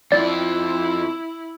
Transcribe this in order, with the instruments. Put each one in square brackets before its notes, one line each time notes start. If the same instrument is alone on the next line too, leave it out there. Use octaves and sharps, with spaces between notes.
[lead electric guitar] F2 [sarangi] E4 [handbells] D5